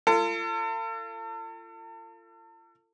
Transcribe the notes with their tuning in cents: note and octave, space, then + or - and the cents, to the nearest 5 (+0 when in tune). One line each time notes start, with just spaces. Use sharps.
F4 -30 A4 +40